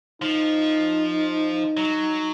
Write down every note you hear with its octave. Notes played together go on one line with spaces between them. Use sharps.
F3 D#4
F#3